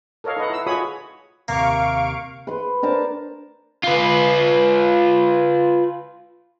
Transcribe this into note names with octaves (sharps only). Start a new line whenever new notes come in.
A4 A#4 C#5 D#5 F5
D#4 A4 B4 D#5 F#5
E4 E6
F4 F#4 G#4 C#5 B5 D#6
D#2 C3 A#3 F5 C#6 D7
B4 C6
D4 A#4 C5 A5
F4 B4